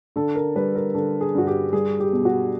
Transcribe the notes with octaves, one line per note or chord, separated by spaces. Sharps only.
D3 A4
A#4
G3 B4
A#4
D3 A4
G#4
G2 F#4
G4
G3 G#4
G4
B2
F#4